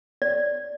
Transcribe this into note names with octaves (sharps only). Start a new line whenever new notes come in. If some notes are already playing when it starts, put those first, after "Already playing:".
D5